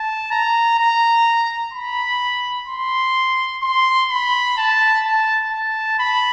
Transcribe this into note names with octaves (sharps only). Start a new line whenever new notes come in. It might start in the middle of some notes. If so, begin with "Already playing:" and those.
Already playing: A5
A#5
A#5
B5
C6
C6
B5
A5
A5
A5
B5